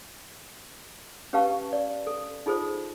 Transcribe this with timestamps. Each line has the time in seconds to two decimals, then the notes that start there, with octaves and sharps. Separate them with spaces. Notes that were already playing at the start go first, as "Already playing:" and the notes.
1.33 C#4 G4 B4 F5 A5 C#6
1.73 D5
2.07 A4
2.46 D#4 F4 G#4 A4 C5